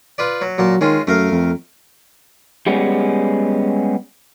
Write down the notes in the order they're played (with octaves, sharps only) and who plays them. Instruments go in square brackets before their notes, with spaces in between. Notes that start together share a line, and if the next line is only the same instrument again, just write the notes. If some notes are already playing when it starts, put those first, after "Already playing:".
[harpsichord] F4 B4 D5
F#3
[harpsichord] A#2 A#3 A5 [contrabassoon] F#3
[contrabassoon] D#3 [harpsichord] G#3 C#4 F4
[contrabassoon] F#2 [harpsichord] A3 A#4 F5
[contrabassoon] F2
[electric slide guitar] G3 G#3 B3 C#4